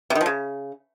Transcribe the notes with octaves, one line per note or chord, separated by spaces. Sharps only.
C3
D#3
F3
C#3